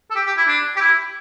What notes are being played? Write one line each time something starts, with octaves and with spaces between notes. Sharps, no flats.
A4
G4
G4
E4
D4
G4
E4